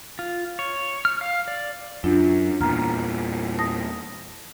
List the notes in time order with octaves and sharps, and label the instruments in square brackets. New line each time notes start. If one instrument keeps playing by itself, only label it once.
[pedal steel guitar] F4
C#5
F6
F5
D5
[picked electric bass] F#2 [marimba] D4 F4
[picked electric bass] E2 A#2 [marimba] A#5 F6
[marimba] A5 D#6 A#6